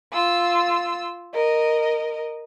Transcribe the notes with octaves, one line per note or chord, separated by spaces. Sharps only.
F4 E6
A#4 D#5